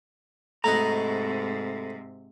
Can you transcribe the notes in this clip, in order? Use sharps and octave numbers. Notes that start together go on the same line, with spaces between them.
G#2 C3 A3 E4 F#4 D#5 A#5